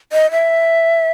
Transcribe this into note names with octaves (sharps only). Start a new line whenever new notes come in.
D#5
E5